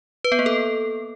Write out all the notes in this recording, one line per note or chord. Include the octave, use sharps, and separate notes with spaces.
B4
B3
A#3
A4